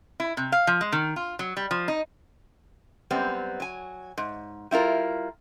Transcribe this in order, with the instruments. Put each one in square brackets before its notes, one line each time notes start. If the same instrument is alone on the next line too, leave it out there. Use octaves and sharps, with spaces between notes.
[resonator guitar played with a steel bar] E4
C3
F5
F3
G#3
D#3
F4
F#3
G3
F3
D#4
F#2 G3 B3 C4
F#3 G#5
G#2
G3 E4 F4 A#4